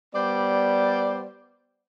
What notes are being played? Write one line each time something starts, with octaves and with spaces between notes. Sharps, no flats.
G3 B3 C5 D5